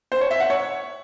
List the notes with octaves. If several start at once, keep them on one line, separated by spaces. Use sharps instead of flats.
C5
C#5
E5
F#5
C#5